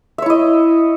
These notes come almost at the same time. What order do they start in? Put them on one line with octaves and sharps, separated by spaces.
E5 C#5 E4 D#5